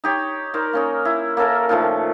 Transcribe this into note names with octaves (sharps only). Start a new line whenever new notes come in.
D#4 G4 C#5
D#4 A#4 C5 D5
A#3 C#4 D#4
E4
A#3 C#4 A4 A#4
A#2 D#3 F3 A3